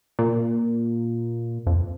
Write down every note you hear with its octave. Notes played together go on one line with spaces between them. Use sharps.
A#2
F2